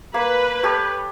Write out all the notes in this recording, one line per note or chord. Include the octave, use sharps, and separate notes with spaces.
A#3 B4
G4 A4 C#5